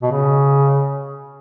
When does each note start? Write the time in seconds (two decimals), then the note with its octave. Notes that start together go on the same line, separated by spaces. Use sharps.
0.03 B2
0.11 C#3